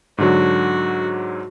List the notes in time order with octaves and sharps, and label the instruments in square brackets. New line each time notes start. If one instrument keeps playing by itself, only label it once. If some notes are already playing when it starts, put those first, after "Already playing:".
[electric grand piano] G#2 D3 F#3 [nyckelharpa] F#4